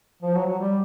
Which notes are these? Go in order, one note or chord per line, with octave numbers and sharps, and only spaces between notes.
F3
F#3
F#3
G3